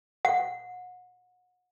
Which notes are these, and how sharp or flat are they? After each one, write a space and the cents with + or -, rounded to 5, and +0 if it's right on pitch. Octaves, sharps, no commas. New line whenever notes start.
F#5 -30